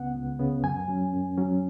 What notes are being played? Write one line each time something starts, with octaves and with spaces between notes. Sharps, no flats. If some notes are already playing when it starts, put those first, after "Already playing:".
Already playing: C#2 C#3 B3 F#5
C#2
C#3 B3
F#2 G#5
F#3 C#4
F#2
F#3 C#4